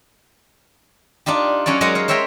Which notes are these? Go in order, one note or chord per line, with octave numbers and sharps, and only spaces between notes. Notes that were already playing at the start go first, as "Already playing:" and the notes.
D4 D#4 F4 G4
F#3 C#4 C#5 D5
F#3 G#3 D#4 A#4 F#5
C#5 F5
C5 C#5 E5 G5 A#5